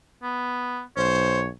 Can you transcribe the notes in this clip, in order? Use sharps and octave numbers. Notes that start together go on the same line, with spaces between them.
B3
B1 C5 C#5